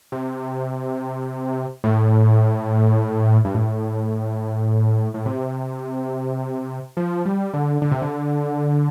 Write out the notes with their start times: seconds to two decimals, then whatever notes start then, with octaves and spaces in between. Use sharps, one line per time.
0.12 C3
1.84 A2
3.45 G2
3.55 A2
5.14 A2
5.26 C3
6.97 F3
7.26 G3
7.54 D3
7.82 D3
7.91 C3
8.02 D3